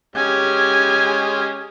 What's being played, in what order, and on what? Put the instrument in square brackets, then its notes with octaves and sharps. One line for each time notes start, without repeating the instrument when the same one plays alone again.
[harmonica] G#3 C#4 [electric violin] G4 G#5